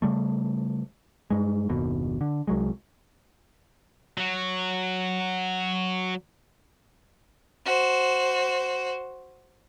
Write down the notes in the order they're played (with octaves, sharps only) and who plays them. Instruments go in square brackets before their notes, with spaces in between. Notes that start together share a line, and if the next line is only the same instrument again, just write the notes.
[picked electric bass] C#3 G3 A3
G2 G#3
F#1 D#2 B2
D3
C2 F#3 G#3
[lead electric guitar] F#3 F#4
[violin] F#4 C5